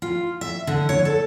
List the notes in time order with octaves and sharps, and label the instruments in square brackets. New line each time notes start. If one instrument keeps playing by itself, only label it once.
[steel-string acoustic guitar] F4
E5
D3
C#5
A4